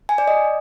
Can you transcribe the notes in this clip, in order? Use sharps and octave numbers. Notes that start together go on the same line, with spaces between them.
G#5
D5
D#5